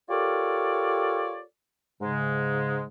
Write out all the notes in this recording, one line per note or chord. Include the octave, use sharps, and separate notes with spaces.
F4 G4 A4 A#4 C#5 D5
G#2 C#3 G#3